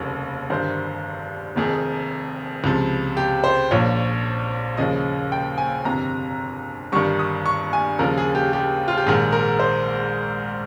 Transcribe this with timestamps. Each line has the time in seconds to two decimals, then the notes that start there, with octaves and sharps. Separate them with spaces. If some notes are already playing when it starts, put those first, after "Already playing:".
Already playing: F1 D#2 C#3 G3
0.50 G1 G2 D#3 C5
1.56 F1 F2 D#3 G#4
2.64 C#2 C3 F3
3.17 G4
3.44 C5
3.71 A#1 A#2 F3 C#5
4.77 D#2 C#3 F3 D#5
5.32 G5
5.58 G#5
5.85 G1 F2 C3 A#5
6.92 G1 G2 D#3 G3 C#6
7.19 D#6
7.46 C#6
7.73 G#5
7.99 D#2 C#3 F3 A#4
8.18 G#4
8.35 G4
8.53 G4
8.88 F4
8.98 G4
9.06 A#1 G#2 D#3 G#4
9.32 A#4
9.59 C5